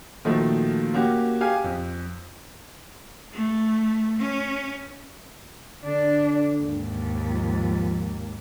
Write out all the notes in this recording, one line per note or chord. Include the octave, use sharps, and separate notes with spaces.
A#2 D#3 F3 F#3 A3
A#3 C#4 F#4 G4
G4 G#4 F5 G#5
F2
A3
C#4
D3 D4
D#2 G#2
F3